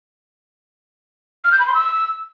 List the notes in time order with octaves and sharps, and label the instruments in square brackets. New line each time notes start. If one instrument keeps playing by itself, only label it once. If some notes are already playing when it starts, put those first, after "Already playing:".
[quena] F6
G6
B5
C6
E6